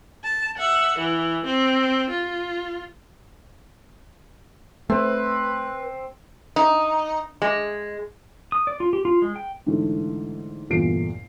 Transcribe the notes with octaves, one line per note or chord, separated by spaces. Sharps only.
A5
E5 F#5
E3
C4
F4
A3 C4 B4
D#4
G#3
D#6
D5
F4
G4
F4
G#3
G5
G#2 D3 E3 A3
G1 E2 A#2 A3 C7 D7